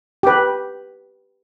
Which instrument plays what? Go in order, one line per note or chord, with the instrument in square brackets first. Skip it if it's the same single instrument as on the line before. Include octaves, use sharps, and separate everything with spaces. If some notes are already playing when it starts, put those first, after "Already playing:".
[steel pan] G4 B4